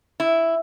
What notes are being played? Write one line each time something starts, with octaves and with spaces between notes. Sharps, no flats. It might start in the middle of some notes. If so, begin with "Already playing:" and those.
E4